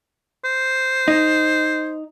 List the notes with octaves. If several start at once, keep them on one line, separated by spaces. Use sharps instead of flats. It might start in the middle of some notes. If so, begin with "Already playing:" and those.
C5
D#4